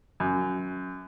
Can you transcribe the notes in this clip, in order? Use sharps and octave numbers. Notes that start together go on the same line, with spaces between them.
F#2